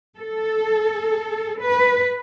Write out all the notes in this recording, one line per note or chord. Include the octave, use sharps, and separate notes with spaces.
A4
B4